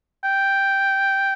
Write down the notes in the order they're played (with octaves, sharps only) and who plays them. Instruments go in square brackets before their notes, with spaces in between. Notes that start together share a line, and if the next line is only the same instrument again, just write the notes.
[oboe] G5